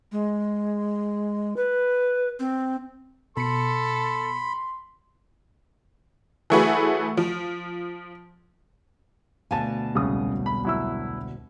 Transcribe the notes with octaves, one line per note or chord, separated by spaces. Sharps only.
G#3
B4
C4
B2 A4 B5 C6 C#7
E3 F#3 A3 F#4 G#4 B4
F3
D2 B2 F5 G#5 A5
E1 C2 C#3 D#6
B5
F#3 E4 E6